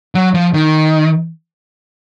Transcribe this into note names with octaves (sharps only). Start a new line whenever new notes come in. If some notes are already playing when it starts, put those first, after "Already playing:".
F#3
F3
D#3